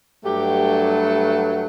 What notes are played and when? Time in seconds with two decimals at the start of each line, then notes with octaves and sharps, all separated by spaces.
0.24 G2 F#3 A3 G4